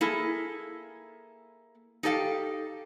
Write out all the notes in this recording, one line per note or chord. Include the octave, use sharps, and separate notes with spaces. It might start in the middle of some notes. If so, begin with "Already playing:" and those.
A#3 E4 G#4 A4
D#4 G4 A4 E5 F5